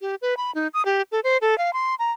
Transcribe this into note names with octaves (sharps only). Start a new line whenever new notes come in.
G4
B4
B5
D#4
D#6
G4
A4
C5
A4
F5
C6
A#5